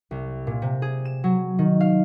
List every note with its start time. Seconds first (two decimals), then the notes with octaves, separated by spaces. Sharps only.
0.11 C2
0.47 A#2
0.62 C3
0.82 G#4
1.05 E7
1.24 F#3
1.59 D#3
1.81 F5